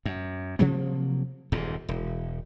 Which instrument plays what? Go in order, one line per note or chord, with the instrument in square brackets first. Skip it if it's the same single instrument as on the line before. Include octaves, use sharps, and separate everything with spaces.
[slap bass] F#2
C3 F3 F#3 A#3
D#1 E2 G#2
E1